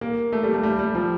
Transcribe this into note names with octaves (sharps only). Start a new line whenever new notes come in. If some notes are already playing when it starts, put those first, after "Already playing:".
A#3
A3
G3
A3
G3
G3
F3